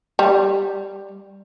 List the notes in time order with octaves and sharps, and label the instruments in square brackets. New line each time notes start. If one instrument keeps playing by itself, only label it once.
[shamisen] G3